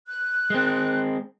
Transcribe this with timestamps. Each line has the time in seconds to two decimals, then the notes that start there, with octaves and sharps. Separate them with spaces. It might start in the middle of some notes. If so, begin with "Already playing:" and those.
0.08 F#6
0.50 G#3 C4